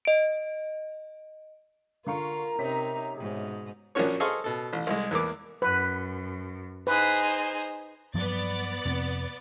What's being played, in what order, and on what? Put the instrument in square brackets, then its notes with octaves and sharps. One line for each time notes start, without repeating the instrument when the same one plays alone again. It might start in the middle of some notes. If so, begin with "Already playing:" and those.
[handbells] D#5 D7
[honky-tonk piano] D3 F5 C#6 [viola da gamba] F4 [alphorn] A#4 [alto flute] A#5
[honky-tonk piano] C3 C#4 B6 [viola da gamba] C4 D#4
[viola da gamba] G#2 B2 [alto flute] G#4
[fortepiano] A#1 A#2 A#3 C#4 F#4 C#5
G#4 A4 C5 D#5 F5 C#6
B2 A4
A1
C2 G#3
E2 E3 A#3 D6
[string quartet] F#2 [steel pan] B4
[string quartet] D#4 G#4 C5 [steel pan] B4
[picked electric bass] G2 F3 F#3 [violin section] B3 D5 A6
[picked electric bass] F1 F2 C3